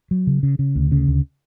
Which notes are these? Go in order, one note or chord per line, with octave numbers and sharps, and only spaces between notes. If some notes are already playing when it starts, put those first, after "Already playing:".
F#3
C#3
C#3
C#3
D2
C#3
D2